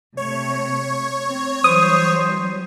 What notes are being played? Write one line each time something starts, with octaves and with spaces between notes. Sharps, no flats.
C3 A3 C#5
C4
E3 F#3 G3 C5 D#6